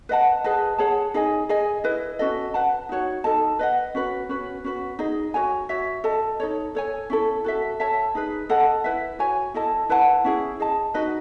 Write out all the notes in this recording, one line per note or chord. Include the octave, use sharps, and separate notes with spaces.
B4 D#5 F#5 A5
G#4 B4 D#5 A5
G#4 C#5 F#5 A5
D#4 G#4 D#5 G#5
G#4 D#5 G#5
E4 B4 D#5
C#4 F#4 A4 D#5
B4 F#5 A5
D#4 F#4 C#5
D#4 A4 D#5 A5
B4 D#5 F#5
C#4 F#4 B4
C#4 F#4 B4
C#4 F#4 B4
D#4 G#4 D#5
F#4 A4 C#5 G#5
F#4 C#5 E5
A4 D#5 A5
D#4 A4 C#5
A4 C#5 G#5
C#4 E4 A4
F#4 A4 E5
A4 C#5 E5 A5
D#4 G#4 B4
A4 D#5 F#5 A5
E4 B4 E5
F#4 C#5 G#5
E4 A4 D#5 A5
E4 B4 F#5 A5
C#4 E4 G#4
G#4 D#5 A5
D#4 F#4 B4 D#5